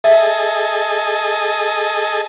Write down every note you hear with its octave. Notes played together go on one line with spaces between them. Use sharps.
G#4 A4 D#5 E5